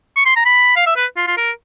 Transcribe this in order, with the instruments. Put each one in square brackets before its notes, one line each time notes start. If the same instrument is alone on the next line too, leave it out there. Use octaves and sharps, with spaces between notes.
[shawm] C#6
C6
A#5
B5
F5
E5
B4
F4
F4
A#4